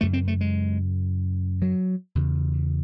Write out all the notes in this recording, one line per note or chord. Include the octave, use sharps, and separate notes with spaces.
F#2 C#3 A3
C4
A3
G#3
F#3
E2 C#3